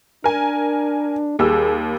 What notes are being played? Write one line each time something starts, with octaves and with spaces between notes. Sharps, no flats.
D4 A#4 G#5
D#2 G3 G#4 E6